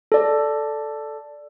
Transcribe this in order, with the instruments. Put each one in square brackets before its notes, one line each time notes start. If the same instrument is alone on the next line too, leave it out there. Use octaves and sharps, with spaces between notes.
[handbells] A4 D5